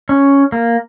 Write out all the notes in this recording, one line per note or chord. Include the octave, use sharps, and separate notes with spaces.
C#4
A#3